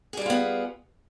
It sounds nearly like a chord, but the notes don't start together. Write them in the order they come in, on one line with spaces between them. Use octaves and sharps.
G#4 G3 E4 F4 B3